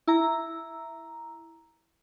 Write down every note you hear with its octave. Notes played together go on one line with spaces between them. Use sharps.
E4 A#5